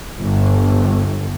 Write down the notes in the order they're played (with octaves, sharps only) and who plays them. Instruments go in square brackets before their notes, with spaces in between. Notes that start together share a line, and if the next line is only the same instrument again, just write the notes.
[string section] G1